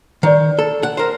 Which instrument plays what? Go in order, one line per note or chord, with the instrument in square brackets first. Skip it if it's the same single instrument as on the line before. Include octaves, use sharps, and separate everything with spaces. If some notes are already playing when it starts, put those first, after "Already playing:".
[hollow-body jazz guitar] D#3 [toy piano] B4 D5
[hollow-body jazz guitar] A4
F#5
A#4 C5